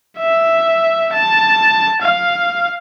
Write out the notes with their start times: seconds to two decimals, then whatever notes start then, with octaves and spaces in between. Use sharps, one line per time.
0.18 E5
1.13 A5
2.02 F5